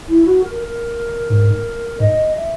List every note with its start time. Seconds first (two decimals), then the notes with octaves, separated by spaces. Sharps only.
0.08 E4
0.26 F#4
0.44 A#4
0.61 A#4
1.30 G#2
2.00 G#2 D#5
2.35 E5